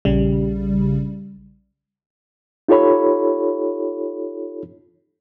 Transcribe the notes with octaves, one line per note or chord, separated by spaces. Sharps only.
A#1 C#3 G3
D#4 F4 G4 A4 C#5 B5